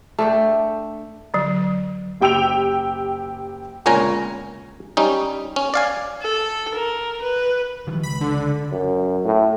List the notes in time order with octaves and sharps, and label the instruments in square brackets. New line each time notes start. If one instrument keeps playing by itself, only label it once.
[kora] A3 D4 G5
[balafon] D3 F#3
[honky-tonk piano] F#1 G4 G5 E6 D7 F7
[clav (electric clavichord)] G1 C#2 A#2 C#4 G#5 A#5
G3 C#4 D#4
C#4
D5 F5 G#5
[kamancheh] A4
A#4
B4
[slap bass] D#3 F3 G3
[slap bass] C#2 [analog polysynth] B5
[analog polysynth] D3
[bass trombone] F#2
A2